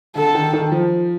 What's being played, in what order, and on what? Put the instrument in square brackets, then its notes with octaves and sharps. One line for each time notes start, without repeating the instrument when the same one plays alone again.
[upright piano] D3 [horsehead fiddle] A4
[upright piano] D#3
D#3
F3